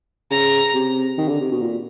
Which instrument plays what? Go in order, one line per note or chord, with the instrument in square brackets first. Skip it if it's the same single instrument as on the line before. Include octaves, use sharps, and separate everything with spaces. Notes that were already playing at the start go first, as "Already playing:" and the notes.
[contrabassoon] C#3 [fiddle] A#5
[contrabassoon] C3
D#3
D3
C3
B2
A#2